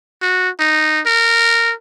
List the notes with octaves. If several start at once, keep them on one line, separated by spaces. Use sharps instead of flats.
F#4
D#4
A#4